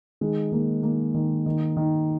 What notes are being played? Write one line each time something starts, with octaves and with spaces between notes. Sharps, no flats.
D#3 G#3
D#3 A#3
D#3 A#3
D#3
D#3
D#3